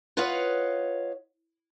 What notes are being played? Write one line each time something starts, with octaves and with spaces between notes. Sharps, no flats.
F4 B4 C#5 D#5 F5 F#5